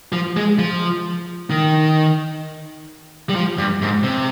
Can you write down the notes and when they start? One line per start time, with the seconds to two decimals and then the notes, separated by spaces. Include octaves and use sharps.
0.12 F3
0.37 G#3
0.59 F3
1.50 D#3
3.29 G3
3.35 F3
3.58 G2
3.82 G#2
4.04 C3